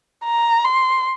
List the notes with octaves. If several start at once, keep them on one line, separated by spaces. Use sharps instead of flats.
A#5
C6